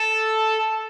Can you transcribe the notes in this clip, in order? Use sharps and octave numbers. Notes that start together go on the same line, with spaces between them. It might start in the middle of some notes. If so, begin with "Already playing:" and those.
Already playing: A4